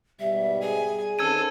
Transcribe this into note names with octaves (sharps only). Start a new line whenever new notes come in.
G#2 B2 G3 E5
G#4 G#5
D#3 C4 C#4 A4 C5 E6 G#6 D#7